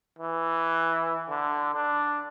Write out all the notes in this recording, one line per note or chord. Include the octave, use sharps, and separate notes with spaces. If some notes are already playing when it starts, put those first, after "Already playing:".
E3
D3
D4